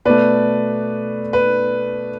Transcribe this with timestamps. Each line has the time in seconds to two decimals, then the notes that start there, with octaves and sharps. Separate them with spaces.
0.05 B2 A3 B4 D5
1.33 B4